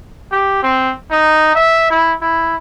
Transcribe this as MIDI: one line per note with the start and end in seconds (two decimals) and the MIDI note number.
0.32 0.58 67
0.63 0.92 60
1.11 1.53 63
1.55 1.90 76
1.90 2.13 64
2.21 2.55 64